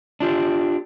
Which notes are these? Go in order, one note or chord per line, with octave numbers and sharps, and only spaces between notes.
D4 F4 G4